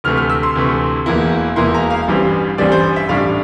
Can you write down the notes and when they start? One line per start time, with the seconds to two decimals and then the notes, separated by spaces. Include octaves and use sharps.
0.04 D2 C3 E3 A3 F6
0.17 F6
0.30 E6
0.43 C6
0.55 D2 C3 E3 A3
1.06 E1 E2 E3 A#3 E4
1.56 E1 E2 E3 A#3 E4 C6
1.74 A#5
1.90 F5
2.08 A1 G2 E3 G3 C4
2.58 A1 G2 E3 G3 C4 D5
2.72 C5
2.96 E5
3.09 A1 A2 G3 D4 F5